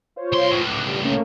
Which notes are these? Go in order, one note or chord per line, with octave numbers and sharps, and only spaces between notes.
F4 C5 C#5
C2 C6
C#2 A2
D6 F#6
G3
A3 A#3 C#4